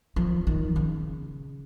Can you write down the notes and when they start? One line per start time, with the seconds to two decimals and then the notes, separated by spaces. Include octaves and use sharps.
0.16 F3
0.47 D#3
0.76 C#3